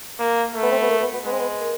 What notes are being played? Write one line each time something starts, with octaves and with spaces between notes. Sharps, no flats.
A#3
A3
B3
C4
B3
A#3
B3
B3
G#3 B3
C4
B3
A#3